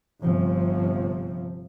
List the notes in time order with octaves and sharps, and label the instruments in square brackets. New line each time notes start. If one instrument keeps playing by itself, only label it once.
[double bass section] G1 C3 F3